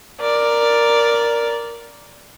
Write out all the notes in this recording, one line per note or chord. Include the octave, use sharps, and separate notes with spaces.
A#4 D5